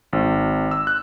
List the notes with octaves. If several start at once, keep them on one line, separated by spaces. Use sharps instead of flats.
G#1
E6
F#6